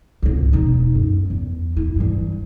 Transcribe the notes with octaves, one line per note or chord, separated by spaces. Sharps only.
G#1 C#2
E1 D#4
F#2
E2
E4
G2 E3